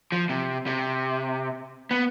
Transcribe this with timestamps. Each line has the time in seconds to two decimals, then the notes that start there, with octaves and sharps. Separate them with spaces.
0.12 F3
0.29 C3
0.67 C3
1.91 B3